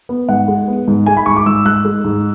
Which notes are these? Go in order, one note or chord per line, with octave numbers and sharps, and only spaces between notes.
B3
G#2 F#5
G#3
B3
G#2
G#3 G#5
B5
G#2 C#6
D6
G#2 E6
G#2 F#6
G#3
G#2